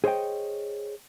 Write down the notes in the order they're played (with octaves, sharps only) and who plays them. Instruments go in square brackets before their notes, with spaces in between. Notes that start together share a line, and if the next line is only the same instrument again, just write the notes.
[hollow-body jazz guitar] G#4 C5 C#5 D#5 G5